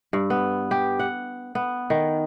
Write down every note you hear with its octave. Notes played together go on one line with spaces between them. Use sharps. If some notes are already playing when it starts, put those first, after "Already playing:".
G2
B3
G4
F#5
B3
D#3